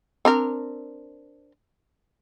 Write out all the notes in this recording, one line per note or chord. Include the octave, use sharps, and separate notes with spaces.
C4 D4 A#4